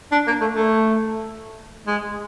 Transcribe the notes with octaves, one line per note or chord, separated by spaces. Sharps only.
D4
A#3
A3
A3
G#3